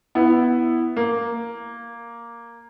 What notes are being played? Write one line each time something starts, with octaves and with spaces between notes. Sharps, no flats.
B3 E4
A#3